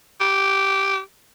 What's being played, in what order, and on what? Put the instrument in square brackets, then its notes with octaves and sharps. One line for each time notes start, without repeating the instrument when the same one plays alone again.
[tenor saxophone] G4